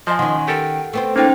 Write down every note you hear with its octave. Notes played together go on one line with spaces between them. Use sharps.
F3 C5 D#5 G#5 C6
D#3 C#4 F#5
G4 A4 A#4 G5
A3 B3 C4 G5
A#3 C#4 D#4 F4 C5 G5